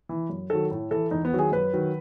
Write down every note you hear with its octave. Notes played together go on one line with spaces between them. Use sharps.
E3
F#2
D#3 F#3 A4
A2
E3 A4
E2 D#4
B3
D#3 F#3
G#4
F#2 B4
D#3 F#3